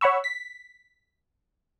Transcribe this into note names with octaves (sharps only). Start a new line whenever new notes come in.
C#5 F#5 B5 C#6 E6
B6